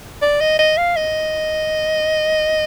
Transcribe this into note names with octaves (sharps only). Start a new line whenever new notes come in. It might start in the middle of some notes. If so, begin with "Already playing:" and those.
D5
D#5
D#5
F5
D#5